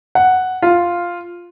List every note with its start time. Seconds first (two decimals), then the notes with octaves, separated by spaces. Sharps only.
0.15 F#5
0.62 F4